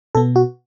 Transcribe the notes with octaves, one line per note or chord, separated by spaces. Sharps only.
B2 B3 A4
F#4